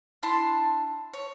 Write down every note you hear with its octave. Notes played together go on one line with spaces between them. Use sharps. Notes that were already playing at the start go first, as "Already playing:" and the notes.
D4 E4 A5 C6
C#5